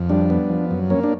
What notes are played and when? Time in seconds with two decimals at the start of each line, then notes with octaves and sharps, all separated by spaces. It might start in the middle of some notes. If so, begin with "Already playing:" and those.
Already playing: F2
0.09 G3 D4
0.30 B3
0.50 F3
0.71 F#2
0.90 A#3 C#4
1.04 D4